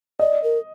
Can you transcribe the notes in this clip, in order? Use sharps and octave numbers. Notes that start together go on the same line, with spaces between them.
D5 D#5
A#4